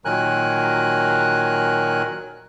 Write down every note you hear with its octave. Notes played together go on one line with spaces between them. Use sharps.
A#2 D#3 F#3 A#4 G#5 F#6